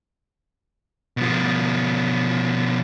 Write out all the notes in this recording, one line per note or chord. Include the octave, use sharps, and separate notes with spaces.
B2 F3